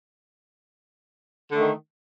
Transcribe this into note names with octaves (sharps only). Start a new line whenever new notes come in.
D3 D#3 A3